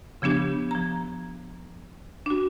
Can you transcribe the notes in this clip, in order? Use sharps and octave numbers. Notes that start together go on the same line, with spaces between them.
C#3 F3 B3 D4 G4
F3 A#5
D4 F#4